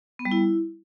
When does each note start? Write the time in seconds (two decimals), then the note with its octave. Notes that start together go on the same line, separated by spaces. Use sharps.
0.19 B3
0.25 G3
0.31 E4